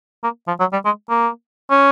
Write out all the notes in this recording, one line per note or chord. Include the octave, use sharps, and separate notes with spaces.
A#3
F3
F#3
G3
G#3
A#3
C#4